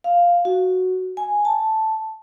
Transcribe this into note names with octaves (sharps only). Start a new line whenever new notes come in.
F5
F#4
G#5
A5